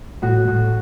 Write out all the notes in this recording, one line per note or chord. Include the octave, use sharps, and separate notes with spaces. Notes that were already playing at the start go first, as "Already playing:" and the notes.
A2 F#4
A2